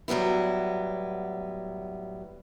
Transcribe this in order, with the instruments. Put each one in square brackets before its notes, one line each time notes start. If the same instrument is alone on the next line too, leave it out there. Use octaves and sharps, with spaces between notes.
[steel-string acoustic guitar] A2 F#3 G3 B3 E4